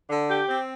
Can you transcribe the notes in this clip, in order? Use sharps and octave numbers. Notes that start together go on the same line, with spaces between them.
D3
G4
C4